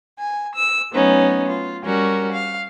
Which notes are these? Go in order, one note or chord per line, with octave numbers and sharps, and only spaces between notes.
G#5
E6
F#3 A3 B3 C#4 D#4
F4
G3 C#4 F#4 A#4
F5